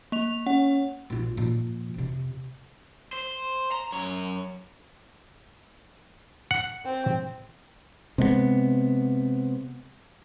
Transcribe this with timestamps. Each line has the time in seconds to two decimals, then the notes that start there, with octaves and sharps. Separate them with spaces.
0.12 A#3 F7
0.46 C#4 F#5
1.10 A#1 F4
1.37 A#2 F3
1.94 F2 C3
3.13 C5
3.72 A#5
3.92 F#2 C#5
6.51 F#5
6.86 C4
8.18 C3 G#3 A3 B3